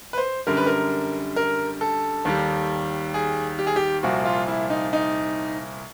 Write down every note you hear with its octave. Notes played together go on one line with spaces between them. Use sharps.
B4
C5
F#2 D3 G3 A#4
B4
A#4
A#4
A4
D#2 D#3 G3
G#4
G4
G#4
G4
C2 A#2 F3 F#4
F4
E4
D#4
D#4